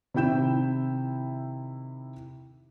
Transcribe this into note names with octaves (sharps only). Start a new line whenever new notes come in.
C3 D#3 E4 G5 G6 E7